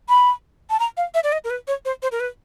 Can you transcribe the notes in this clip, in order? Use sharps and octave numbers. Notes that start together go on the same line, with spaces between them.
B5
A5
A#5
F5
E5
D5
D#5
A#4
B4
C#5
C5
C5
A#4
B4